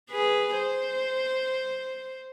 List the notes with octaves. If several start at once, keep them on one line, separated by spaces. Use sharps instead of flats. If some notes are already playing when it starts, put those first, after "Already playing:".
G#4 B4
C5